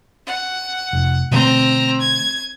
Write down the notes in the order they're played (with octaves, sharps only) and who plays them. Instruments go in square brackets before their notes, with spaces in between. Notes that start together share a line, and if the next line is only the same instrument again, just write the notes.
[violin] F#5
[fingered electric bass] F1
[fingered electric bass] B2 D3 A3 [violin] C4 A#5
[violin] G#6